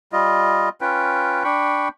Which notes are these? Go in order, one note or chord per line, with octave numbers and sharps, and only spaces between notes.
G3 F4 D#5
C#4 F4 B4 G5
D4 G5 B5 C#6